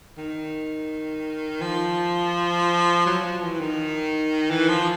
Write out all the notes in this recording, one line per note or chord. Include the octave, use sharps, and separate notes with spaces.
D#3
F3
F#3
F3
E3
D#3
E3
F3